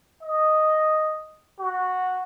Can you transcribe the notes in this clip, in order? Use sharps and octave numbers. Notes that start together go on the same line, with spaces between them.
D#5
F#4